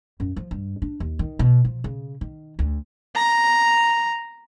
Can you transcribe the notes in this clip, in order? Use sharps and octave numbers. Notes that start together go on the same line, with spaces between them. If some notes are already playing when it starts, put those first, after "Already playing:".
F#2
F3
G2
D4
D#2
D#3
B2
F3
C#3
D#3
D2
A#5